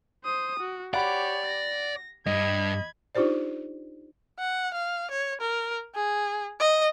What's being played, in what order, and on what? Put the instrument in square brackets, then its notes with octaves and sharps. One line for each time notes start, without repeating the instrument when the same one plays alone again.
[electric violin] C5 D#6
F#4
[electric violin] G4 C#5 [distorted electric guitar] D5 [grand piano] F#5 B5
[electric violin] A#6
[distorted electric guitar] G2 [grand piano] D#5 [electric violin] B5 G#6
[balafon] D4 D#4 F4 G4 C5 D5
[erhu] F#5
F5
C#5
A#4
G#4
D#5